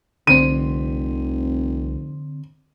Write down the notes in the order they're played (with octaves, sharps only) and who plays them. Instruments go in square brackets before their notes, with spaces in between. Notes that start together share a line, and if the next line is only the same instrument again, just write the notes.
[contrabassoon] F1 [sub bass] C2 [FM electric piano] D3 C4 [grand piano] D#7